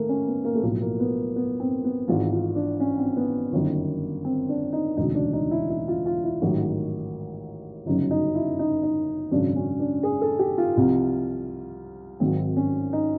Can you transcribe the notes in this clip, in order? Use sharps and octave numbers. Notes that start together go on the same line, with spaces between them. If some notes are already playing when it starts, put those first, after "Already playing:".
Already playing: D#3 A3 A#3
C#4
B3
A#3
A3
B1 A2 F3 A#3
A#3
B3
B3
C4
B3
G#1 G#2 E3 F4
F4
D4
C#4
C4
B3
G1 F#2 D#3
C4
D4
D#4
E1 D2 C#3 D#4
D4
D#4
E4
E4
F4
F4
E4
A1 G#2 D#3 F#3
G1 F#2 C#3 F#3 D#4
D#4
E4
D#4
D#4
G#1 F#2 C#3 D4
C#4
D4
G#4
A4
G4
F4
C2 C3 F3
G#1 G#2 D#3 F#3 C4
C#4
D#4